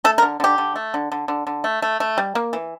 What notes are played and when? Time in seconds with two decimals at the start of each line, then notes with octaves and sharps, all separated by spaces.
0.04 A3 A4
0.18 A#4
0.22 D3
0.40 D3 G4
0.58 D3
0.76 A3
0.94 D3
1.12 D3
1.28 D3
1.47 D3
1.64 A3
1.82 A3
2.00 A3
2.18 G3
2.35 A#3
2.53 E3